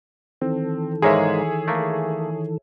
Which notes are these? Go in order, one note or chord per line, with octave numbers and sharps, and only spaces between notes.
D#3 E3 C4 A4
G#2 G#3 A#3 G#4 C#5 E5
A3 A#3